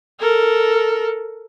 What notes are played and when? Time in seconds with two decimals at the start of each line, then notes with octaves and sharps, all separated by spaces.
0.19 A4 A#4